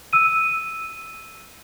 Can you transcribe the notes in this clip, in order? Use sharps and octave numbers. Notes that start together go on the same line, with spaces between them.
E6 D#7